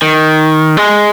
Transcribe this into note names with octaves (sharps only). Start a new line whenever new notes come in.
D#3
G#3